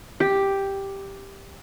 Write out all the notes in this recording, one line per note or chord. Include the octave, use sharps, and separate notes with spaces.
G4